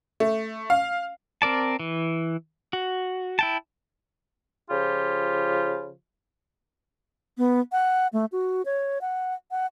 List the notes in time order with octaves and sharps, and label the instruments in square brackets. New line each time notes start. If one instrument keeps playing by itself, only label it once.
[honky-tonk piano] A3
F5
[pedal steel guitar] C4 A#4 D5 A5
E3
F#4
E4 G5 A5
[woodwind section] C#3 F3 F4 G4
[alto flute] B3
F#5
A3
F#4
C#5
F#5
F#5